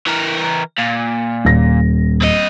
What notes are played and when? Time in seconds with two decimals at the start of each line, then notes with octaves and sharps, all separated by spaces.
0.07 E3 A#4
0.78 A#2
1.45 D#1 A#6
2.22 C4 D#5